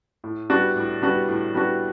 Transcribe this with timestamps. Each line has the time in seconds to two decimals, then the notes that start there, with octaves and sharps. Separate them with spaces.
0.24 A2
0.50 G3 B3 D4 F#4
0.76 A2
1.02 G3 B3 D4 F#4
1.28 A2
1.54 G3 B3 D4 F#4